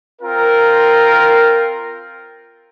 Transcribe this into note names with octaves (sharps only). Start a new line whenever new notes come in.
C4 F4 A#4